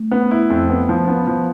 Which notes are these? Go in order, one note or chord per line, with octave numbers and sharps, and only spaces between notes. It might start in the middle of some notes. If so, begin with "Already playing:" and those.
Already playing: A3
B3
E4
F2
B3
F3
B3
F3